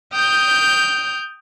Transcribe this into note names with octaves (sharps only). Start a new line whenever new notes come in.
G5 D#6 F6 G6